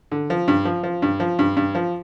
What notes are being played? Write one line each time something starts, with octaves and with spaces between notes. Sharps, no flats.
D3
F3
G2
F3
F3
G2
F3
G2
G2
F3